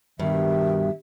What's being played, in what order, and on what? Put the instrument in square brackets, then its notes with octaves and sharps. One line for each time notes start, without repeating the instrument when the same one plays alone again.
[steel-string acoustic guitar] G2 B2 [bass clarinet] D#3 [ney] E5